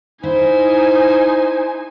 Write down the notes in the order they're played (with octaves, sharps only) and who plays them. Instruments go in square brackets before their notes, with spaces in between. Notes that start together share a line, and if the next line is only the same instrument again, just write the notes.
[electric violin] D#4 G#5 [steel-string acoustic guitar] E4 [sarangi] C5